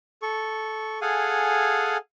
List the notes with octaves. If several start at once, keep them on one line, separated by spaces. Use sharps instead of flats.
A4 C#6
G#4 A4 F5 F#5 G#5